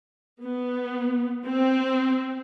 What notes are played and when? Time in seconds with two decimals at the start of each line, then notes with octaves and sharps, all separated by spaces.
0.41 B3
1.45 C4